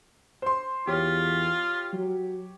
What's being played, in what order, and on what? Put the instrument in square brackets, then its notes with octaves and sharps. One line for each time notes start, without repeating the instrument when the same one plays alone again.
[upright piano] C5 C6
[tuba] E2 [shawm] F4 [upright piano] G4 C#5
[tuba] F#3